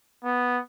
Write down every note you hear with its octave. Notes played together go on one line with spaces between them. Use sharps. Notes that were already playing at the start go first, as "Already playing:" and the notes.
B3